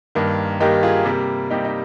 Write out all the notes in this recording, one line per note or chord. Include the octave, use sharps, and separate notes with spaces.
G2 D#3 A#3
G2 D#3 A#3 D#4 G4
F4 G#4
C3 G3 A#3
C3 G3 A#3 D#4 G4
D#4